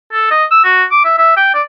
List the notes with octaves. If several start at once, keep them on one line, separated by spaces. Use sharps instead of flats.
A4
D#5
E6
F#4
D6
E5
E5
G5
D5